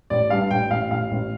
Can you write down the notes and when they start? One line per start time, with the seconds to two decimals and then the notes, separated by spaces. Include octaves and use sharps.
0.10 A1 D5
0.30 G2 F5
0.51 A1 G5
0.71 A1 F5
0.91 A1 F5
1.11 A1